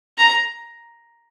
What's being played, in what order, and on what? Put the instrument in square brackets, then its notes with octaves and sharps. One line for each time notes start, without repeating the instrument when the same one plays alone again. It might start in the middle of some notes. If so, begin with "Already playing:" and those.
[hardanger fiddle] A#5